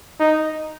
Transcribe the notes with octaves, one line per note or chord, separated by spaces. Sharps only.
D#4